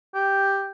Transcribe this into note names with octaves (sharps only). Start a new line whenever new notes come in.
G4